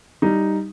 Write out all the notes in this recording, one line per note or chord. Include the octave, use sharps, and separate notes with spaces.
G3 D#4